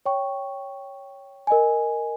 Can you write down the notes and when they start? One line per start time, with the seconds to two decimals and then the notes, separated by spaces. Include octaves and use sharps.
0.06 C#5 G5 C#6
1.47 A#4 D#5 G#5